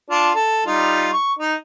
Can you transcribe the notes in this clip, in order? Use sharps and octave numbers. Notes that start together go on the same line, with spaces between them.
D4 F4
A4
G3 D#4 F4
C#6
D#4